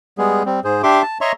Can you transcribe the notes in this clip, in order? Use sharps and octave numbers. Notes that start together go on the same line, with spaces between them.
G3 G#3 B3 G#4
G3 C4
G#2 G#4 C5
D4 G4 E5 C6 D6
A5
C#5 D#5 E5 A#5 C6 C#6